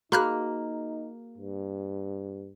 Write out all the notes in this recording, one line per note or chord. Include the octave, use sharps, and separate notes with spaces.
A#3 D#4 F#4 G#4 B5 F6 F#6
G2